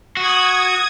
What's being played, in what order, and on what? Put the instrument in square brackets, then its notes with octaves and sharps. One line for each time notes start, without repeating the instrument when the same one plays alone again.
[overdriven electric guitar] F#4 [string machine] D#6 G#6